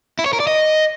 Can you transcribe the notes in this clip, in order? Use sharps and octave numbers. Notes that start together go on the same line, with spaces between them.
E4
C#5
A#4
D5
D#5